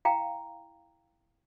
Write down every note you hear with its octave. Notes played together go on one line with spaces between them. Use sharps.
E4 F5 G5 A#5